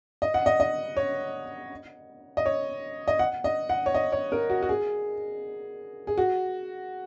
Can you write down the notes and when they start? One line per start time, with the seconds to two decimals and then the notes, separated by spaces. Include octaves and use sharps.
0.22 D#5
0.34 F#5
0.46 D#5
0.60 D#5
0.97 C#5
2.37 D#5
2.46 C#5
3.08 D#5
3.19 F#5
3.44 D#5
3.69 F#5
3.86 C#5
3.94 D#5
4.12 C#5
4.32 A#4
4.50 F#4
4.63 F#4
4.69 G#4
6.07 G#4
6.18 F#4